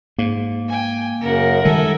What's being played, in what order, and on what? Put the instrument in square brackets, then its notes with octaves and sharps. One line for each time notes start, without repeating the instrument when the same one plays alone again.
[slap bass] G#2 [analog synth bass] A#3
[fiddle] G5 G#5
[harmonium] F#2 C#3 [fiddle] A#4 F#5
[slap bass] D#3 G3 G#3 [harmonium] A4 E5 G#5